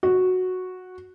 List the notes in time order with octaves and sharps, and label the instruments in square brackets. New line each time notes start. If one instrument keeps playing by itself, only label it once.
[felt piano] F#4